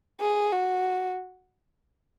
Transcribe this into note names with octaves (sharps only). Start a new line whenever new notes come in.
G#4
F#4